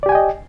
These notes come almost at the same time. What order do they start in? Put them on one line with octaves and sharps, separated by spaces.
D5 G4 G#5 G5 D#5